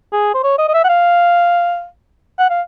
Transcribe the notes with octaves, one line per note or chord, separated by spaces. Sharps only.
G#4
C5
C#5
D#5
D#5
E5
F#5
F5
F#5
F5